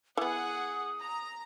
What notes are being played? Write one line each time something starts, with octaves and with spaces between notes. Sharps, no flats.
E3 B3 G#4 F#5 D#6
A#5